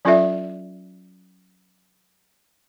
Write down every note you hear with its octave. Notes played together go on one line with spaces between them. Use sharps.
F#3 C#4 F4 A4 D5 E5